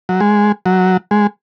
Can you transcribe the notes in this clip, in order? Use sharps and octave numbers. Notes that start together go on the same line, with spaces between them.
F#3
G#3
F#3
G#3